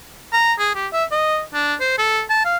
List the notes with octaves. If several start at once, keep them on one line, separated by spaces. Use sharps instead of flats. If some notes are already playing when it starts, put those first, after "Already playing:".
A#5
G#4
G4
E5
D#5
D4
C5
A4
A5
F5